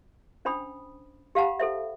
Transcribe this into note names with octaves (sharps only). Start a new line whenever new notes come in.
C#4 D4 C5 G5 B5 D#6
G4 F5 F#5 A5 B5
A4 C5 E5